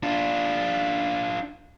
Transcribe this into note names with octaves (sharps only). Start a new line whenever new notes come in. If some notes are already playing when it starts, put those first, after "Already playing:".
D4 F4